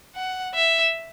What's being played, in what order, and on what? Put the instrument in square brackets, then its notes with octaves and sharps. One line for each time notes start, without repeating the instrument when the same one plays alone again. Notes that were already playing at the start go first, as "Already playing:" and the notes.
[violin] F#5
E5